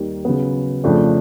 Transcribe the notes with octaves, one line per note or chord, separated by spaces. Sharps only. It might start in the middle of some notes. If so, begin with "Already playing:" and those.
Already playing: D#2 D#3 G3
C#3 F#3 B3
F2 C#3 F3 A3 D4